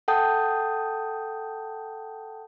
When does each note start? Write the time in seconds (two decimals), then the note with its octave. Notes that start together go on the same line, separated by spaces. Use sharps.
0.08 A4 F#5 G5 A5 D#6 G6